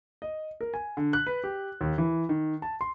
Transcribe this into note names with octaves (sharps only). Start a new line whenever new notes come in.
D#5
A#4
G#5
D3
F#6
B4
G4
D#2
E3
D#3
A5
C6